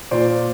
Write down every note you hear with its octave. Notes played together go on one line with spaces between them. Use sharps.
A#2 C5 D5